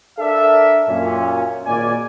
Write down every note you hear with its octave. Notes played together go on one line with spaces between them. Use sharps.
D4 A4 A#4 D5 E5
F#2 A#2 C#4
G#1 A#2 D5 G#5